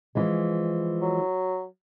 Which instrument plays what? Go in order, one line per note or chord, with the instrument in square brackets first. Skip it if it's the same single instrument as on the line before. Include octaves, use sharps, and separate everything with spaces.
[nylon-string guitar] E3 F3 G#3
[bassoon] F#3